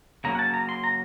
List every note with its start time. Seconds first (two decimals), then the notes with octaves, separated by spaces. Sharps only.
0.24 C#3 F#3 A#3 C#4 A#5
0.35 F#5
0.39 A5
0.54 A#5
0.69 C6
0.84 A#5